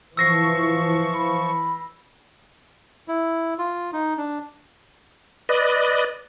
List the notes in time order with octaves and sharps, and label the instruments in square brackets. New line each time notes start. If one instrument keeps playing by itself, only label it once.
[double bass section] E3 [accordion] F3 C#6 [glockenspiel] E6 A#6 C7
[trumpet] B5
[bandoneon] E4
F4
D#4
D4
[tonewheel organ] B4 D5 D#5